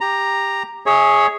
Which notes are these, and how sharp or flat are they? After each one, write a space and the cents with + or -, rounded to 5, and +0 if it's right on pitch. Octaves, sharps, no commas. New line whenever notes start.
G4 +10 A#5 +0
G#4 +0 C#5 +0 E5 -40